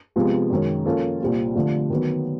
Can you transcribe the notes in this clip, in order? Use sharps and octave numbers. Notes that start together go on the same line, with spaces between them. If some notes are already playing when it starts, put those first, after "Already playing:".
C3 F3 G#3 B3
F#2 D#3 G#3 C#4
F3 A#3 C#4 F4 A4
C2 A#2 G3 C4 F4
D3 F3 A3
D#3 F#3 B3